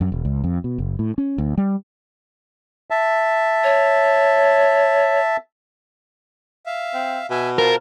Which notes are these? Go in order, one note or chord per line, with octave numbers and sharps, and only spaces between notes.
F#2
E1
C#2
F2
B2
F#1
A2
C#4
D2
G3
E5 A5
C#5
E5 F5
C4
B2 E5 G#5
F4 A#4 C5 A5